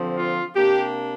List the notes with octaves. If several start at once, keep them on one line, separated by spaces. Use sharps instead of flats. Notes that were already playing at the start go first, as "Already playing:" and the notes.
Already playing: D3 F3 C4
F4
C3 A#3 D4 G4